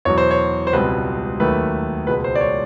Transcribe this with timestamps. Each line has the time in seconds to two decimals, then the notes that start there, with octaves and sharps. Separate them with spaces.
0.05 E2 B2 F#3 C#5
0.18 C5
0.31 C#5
0.67 C5
0.73 C#2 B2 G3 C4 B4
1.40 D#2 D#3 F#3 A3 B4
2.07 C#2 B2 G#3 B4
2.24 C5
2.35 D5
2.41 C#5